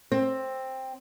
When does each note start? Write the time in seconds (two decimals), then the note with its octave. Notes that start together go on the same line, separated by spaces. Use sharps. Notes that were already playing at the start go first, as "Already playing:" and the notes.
0.12 C4